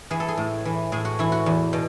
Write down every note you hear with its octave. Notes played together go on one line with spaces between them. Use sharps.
E3 G#4
A4
G#4
A2
E3
A2 G#4
F#4
E3 E4
F#4
E2
B2